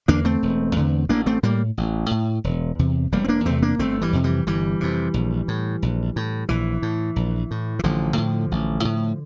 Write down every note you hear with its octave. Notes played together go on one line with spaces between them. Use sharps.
E2 D3 A#3 D4
A3 C4
E1
E2 D3
A1 A#3 D4
A3 C4
A2 G3 A#3
A1
A2
E1
E2 C3
E1 G3 A#3
C4
A#3 D4
E2 C3 A3 C4
A#3 D4
G1 A3 C4
E3 G3
F2 C3
E3 G3
G1 E3 G3
F2 C3
A#1
A2
A#1
A2
A#1 E3
A2
A#1
A2
E3
A1 D3 F3
A2
A1
A2